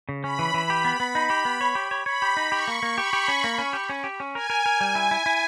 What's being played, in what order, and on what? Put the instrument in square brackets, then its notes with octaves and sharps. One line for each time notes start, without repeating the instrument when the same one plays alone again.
[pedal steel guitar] C#3
[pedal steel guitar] C#4 [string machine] B5
[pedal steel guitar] E3
E3
[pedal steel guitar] G4 [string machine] B5
[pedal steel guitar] B3
B3
D#4
G4
B3
C#5
G4
C#5
[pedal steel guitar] C#5 [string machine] B5
[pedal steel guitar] G4
D#4
[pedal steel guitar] G4 [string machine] C#6
[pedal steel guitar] A#3
A#3
[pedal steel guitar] G4 [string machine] B5
[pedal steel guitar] G4
C#4
A#3
C#4
G4
C#4
G4
C#4
[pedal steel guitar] A#4 [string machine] G#5
[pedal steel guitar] A#4
A#4
G3
E4
E4
E4